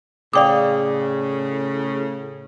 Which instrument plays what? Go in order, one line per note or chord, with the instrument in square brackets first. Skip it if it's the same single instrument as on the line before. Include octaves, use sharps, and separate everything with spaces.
[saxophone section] A2 C#3 [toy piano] D5 D#6 [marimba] F5 G5 D6